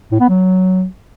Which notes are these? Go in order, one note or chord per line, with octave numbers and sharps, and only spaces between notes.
A2
B3
F#3